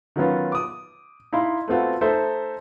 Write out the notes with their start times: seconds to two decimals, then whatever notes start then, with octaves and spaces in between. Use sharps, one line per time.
0.16 D#3 F#3 B3 C#4 F4
0.52 D6 D#6
1.33 D#4 E4 F5 B5 C6
1.68 A3 B3 C4 F4 F#4
2.01 A3 D#4 A4 C5 E5